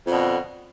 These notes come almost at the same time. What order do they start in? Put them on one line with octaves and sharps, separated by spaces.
F2 D3 B2